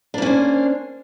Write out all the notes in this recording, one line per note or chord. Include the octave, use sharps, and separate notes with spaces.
A#3 C#4 D4 C5